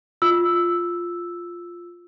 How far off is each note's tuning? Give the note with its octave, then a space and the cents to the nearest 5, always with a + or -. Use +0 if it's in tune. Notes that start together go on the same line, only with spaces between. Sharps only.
F4 +0 E6 +0